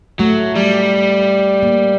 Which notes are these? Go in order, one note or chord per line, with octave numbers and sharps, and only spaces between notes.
F#3 A3
G3
A#3